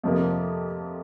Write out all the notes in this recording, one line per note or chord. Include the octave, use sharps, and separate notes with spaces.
F2 C3 F3 A#3